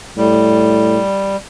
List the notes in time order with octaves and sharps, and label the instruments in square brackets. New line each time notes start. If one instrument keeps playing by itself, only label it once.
[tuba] A2 [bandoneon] G3